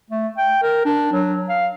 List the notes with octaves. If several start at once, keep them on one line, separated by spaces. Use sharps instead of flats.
A3
G5
A#4
D4
F#3
F5